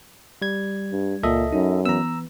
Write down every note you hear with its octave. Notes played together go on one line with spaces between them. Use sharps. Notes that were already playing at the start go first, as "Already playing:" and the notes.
G3 G#6
G2
C#2 A#2 A4 D#5 E5
F#2 D#4
E3 B3 A#5 E6